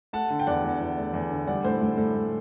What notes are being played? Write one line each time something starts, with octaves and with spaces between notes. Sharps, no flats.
A3 F#5 A5
D3
G5
E2 D5 F#5
E2
E2
A3
E2
D3
G3 D5 F#5
A2 A4 C5
A2
A2 A4
A2